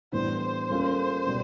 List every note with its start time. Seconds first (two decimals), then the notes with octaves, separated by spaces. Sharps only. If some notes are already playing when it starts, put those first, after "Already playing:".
0.12 A2 E3 G3 B3 D4 C5
0.42 C5
0.70 G3 A#3 C#4 F4 A4
1.26 B2 G3 B3